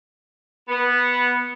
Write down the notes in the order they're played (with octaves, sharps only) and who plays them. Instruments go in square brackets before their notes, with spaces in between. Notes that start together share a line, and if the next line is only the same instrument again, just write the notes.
[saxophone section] B3